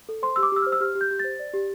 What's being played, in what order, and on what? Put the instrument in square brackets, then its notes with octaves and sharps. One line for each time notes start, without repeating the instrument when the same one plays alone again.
[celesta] A4
C5 C6
G4 E6
D6
G4 E6
C5 F6
E6
G4 F6
G4
G6
G4
C5 A6
D5
G4